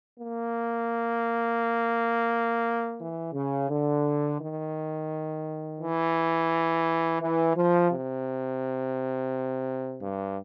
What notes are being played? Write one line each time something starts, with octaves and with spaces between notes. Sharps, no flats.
A#3
E3
C#3
D3
D#3
E3
E3
F3
C3
G2